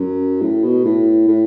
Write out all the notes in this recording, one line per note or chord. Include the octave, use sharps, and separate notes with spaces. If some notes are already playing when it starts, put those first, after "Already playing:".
Already playing: F#2
A2
B2
A2
A2